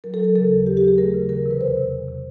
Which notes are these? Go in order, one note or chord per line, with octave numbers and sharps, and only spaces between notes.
F#3 A#4
A4
F#3 A#4
C#3 A4
D#2
D#2 G4
G4
F#3
G#4
A3 A#4
C#3
E3 A#4
C3 B4
E2 C5
C3
E2
C3